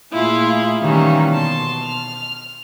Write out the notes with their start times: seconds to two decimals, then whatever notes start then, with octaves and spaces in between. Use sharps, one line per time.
0.13 A#2 A3 E4 F4 G#4
0.81 D#3 E3 G3 A#3 C#4
1.31 B2 A5 C6
1.83 F6